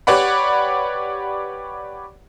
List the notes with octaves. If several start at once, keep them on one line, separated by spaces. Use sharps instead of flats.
G4 B4 C#5 D5 F#5 B5